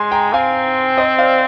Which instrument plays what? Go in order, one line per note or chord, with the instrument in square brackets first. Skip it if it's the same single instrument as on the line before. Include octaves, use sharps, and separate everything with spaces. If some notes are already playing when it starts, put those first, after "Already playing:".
Already playing: [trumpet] G#3 [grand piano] G#5 C6
[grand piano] G5 A#5
[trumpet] C4 [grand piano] F5 G#5
[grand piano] C5 D#5
D5 F5